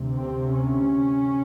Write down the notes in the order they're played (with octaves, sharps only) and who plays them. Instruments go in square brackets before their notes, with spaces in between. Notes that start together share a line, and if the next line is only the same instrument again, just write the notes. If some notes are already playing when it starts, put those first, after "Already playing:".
Already playing: [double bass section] D2 C3
C4
C#4